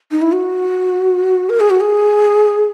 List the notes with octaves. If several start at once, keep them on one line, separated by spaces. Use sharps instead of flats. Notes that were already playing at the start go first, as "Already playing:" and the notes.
D#4
E4
F#4
A#4
G#4
F#4
G#4